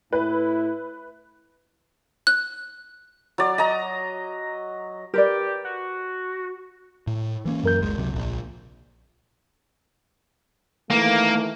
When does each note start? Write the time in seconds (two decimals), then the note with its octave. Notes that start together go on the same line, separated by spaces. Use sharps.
0.13 A2 E4 B4
2.27 F#6
3.38 F#3 D5
3.58 D#5 A#5
5.14 G4 A#4 B4 D5
5.65 F#4
7.07 A2
7.45 E3 A#3 C#4
7.64 F#2 A#4 G6
7.81 F#1 C#2 G#3
7.98 C3 F#3
8.12 D#1 A#1
10.90 D#3 E3 A3 A#3